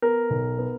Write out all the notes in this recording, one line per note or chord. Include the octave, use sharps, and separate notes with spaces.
B3 A#4
B1
B3